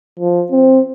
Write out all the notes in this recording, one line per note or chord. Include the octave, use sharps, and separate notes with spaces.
F3
C4